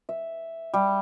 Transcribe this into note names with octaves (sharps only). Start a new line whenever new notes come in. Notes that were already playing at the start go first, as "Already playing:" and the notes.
E5
G3